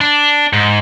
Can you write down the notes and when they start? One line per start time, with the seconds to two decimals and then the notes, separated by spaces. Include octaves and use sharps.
0.01 D4
0.53 G#2